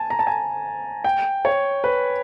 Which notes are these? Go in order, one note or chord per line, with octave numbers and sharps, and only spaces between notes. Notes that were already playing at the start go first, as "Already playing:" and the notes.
Already playing: G#5 A5
A#5
A5
G#5
G5
C#5
B4